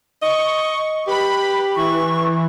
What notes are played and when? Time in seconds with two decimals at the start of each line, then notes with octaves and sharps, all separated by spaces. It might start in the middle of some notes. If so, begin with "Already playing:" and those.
0.22 D#5 C#6
1.07 G4 B4 B5
1.76 E3 C#6